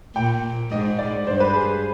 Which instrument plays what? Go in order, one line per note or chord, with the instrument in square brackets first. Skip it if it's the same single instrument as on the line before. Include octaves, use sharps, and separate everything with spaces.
[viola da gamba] A#2 [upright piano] G5
[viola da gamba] G#2 [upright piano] D#5
[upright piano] D5
[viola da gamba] G2 [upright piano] C5
[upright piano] B4
G#4